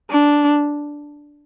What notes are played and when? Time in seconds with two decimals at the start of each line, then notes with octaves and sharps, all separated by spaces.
0.10 D4